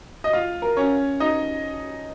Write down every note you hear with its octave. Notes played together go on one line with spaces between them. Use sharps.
D#5
F4 F5
A#4
C#4 C#5
D#4 D#5